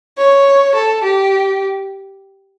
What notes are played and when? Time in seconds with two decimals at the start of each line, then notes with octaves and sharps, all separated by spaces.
0.18 C#5
0.75 A4
1.04 G4